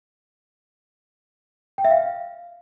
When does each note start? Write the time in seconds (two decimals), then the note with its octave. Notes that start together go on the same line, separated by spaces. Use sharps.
1.78 G5
1.85 E5
1.91 F5